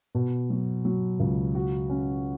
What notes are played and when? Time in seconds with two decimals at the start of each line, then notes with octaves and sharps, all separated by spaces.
0.15 B2
0.50 F#3
0.85 F#3
1.20 C#2
1.55 F#4
1.90 C#4